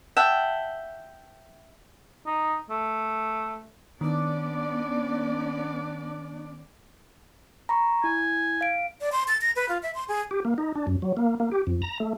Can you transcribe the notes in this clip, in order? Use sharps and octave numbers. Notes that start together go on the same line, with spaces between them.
E5 F#5 G5 A5
D#4
A3
D#3 B3 C#4 D4 D5
A#5 B5 C#6
E4 G#5
F5 D7
D5
C6
A6
A#6
B4
F4
E5
C6
G#4
G4
A#3
D#4
D4
F#2
F#3
A#3
A#3
G4
F2
A#5
A3